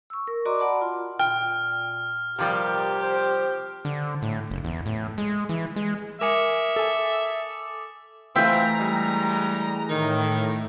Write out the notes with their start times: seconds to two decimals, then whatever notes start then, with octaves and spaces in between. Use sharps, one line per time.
0.10 C#6 E6
0.28 A#4
0.45 F#4 D5 D#5 A#5 C6 D6
0.59 D5 F#5 A5 B5
0.81 F4 C6
1.19 A#2 G5 F6
2.39 C3 F3 G3 G4 A#4
3.02 C5
3.85 D3
4.22 A2
4.51 F#1
4.64 E2
4.86 A2
5.18 G#3
5.49 E3
5.76 G#3
6.21 A#4 E5 G#5 D6 D#6 C#7
6.76 A4 G#5
8.36 E3 A3 C4 F4 E5 G5 A#5
8.78 G3 G#3
9.89 A2 D#3